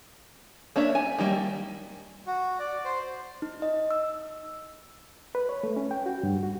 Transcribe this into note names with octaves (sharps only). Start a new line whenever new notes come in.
A#3 D4 C#5 E5
G#5
D#3 G3 A3 A#3
F#4
D5
C5
D#4
D#5
E6
B4
C#5
A3
C#4
G5
F#4
G2
F#4